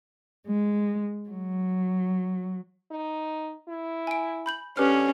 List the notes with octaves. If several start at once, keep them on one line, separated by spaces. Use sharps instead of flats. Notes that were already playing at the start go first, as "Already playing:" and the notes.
G#3
F#3
D#4
E4
G#5 D7
B5 G6 F#7
D3 C#4 G4 B4 F6